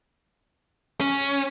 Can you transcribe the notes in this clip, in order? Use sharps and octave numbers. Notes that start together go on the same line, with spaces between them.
C#4